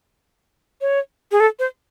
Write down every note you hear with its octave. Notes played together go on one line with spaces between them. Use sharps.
C#5
G#4
A4
C5